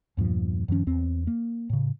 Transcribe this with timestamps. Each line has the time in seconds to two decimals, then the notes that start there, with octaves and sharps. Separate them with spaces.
0.17 E2 G2 A#2 F3
0.68 F#2 D#3 F3 C#4
0.87 E2 C4
1.27 A#3
1.70 A2 C#3